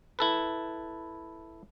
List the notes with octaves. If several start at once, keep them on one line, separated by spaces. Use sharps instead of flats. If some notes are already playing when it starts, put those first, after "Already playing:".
E4 A4 B4